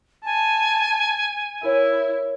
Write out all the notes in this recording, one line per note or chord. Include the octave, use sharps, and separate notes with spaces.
G#5 A5
E4 A#4 C#5